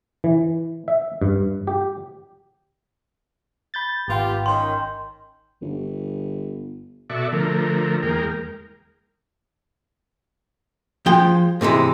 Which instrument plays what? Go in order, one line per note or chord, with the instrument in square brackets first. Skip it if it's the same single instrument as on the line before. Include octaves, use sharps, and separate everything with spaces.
[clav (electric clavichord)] E3
E5
G2
G4
[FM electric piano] B5 G6 A6
[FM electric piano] G#1 G5 [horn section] B3 F4 G4
[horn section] D#3 C#4 [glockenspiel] C6 G6
[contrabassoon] G1
[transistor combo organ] B2 F#4 A4 D5 E5 C#6
D3 F3 A3 A#4
E2 G#3 A#3 A#4 G5
[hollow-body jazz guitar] F3 G#3 G5
G#2 C3 E3 G#3